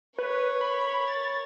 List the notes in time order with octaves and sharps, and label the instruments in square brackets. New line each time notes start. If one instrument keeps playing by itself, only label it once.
[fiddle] A#4 C#5 [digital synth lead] B4
[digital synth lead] B5
A6